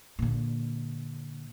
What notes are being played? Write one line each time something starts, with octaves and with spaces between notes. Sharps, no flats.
A#2 D3